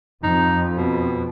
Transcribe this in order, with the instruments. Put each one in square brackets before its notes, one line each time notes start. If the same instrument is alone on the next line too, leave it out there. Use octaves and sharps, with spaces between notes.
[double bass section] F2 [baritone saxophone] D#4
[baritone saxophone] B2